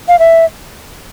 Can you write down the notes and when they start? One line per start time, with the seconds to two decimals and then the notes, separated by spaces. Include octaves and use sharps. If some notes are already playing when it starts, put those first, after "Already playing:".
0.08 F5
0.19 E5